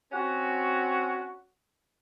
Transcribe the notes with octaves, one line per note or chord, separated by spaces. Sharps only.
C4 C#4 F#4